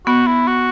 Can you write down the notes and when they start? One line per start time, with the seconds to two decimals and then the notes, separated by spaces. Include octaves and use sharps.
0.06 B3 F#4
0.27 E4
0.48 F#4